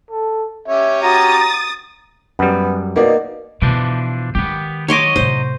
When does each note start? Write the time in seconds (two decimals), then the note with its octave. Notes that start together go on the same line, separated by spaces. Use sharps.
0.11 A4
0.68 C#4 G4 C#5 E5
1.03 F#4 A#5 D#6 A6
2.39 F#2 G3 B3
2.96 B2 A#3 D#4 D5
3.62 B2 E3 F3 D4
4.35 D#3 G#3 B3 G4
4.88 F#3 C#5 D#5 C6 D6
5.16 A2 C3 C5